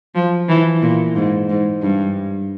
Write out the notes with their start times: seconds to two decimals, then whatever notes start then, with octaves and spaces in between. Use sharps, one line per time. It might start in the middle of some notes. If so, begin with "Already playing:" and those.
0.15 F3
0.49 E3
0.82 A#2
1.15 G#2
1.49 G#2
1.82 G2